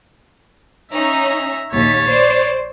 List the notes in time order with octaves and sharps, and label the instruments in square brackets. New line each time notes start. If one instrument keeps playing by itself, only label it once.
[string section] C#4 D#4 [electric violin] E5 A#5
[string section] A#1 D#2 B6 [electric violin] C#5 A6
[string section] C5 D5